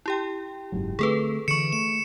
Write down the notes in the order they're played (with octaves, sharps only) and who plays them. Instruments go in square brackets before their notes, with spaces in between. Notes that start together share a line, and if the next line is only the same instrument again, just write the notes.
[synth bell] E4 G4 G5
[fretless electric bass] F#1 G#2 F#3
[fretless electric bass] D3 A3 C4 [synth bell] G#4 A4 B4
[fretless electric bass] D3 E3 [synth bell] C#6 D7 [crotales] C#7 E7
[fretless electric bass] A3 [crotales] E7